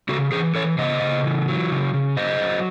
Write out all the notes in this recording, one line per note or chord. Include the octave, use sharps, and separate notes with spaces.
C#3 F#4 A4
E3 G#4 C5
E3 A4 C#5
C#3 C5 D#5
C#3
E3
F#3
C#3
C#3
F#3 C5 D#5
F#3